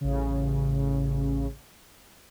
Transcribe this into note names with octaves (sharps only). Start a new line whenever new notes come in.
A1 C#3